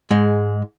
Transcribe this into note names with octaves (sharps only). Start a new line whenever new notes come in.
G#2 G#3